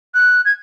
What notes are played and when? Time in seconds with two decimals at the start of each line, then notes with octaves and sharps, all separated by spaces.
0.14 F#6
0.45 G#6